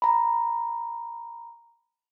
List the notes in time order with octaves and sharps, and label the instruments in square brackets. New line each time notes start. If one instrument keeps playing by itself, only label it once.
[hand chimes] A#5 B5